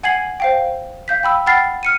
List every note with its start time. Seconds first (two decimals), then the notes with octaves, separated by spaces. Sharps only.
0.03 F#5 G#5 G#6 C7 F#7
0.40 C5 F5 G5
1.08 F5 G6 B6
1.23 G5 B5 E6
1.46 F#5 G5 B5 F6 A6 C7
1.83 F6 C#7 D#7